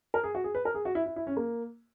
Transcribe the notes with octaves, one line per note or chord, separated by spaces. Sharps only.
A#4
G#4
F#4
G#4
B4
A#4
G#4
F#4
E4
E4
E4
C#4
A#3